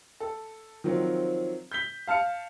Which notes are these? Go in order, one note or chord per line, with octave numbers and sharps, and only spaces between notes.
A4
D#3 F3 F#3 C4
G6 B6 G7
F5 A5 F6 C#7